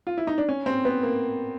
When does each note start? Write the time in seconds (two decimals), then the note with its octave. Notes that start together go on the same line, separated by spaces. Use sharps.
0.07 F4
0.18 E4
0.27 D#4
0.38 D4
0.49 C#4
0.66 C4
0.85 B3
1.03 A#3